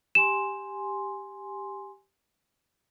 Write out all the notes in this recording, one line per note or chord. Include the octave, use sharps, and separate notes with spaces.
G4 G#5 C6 E7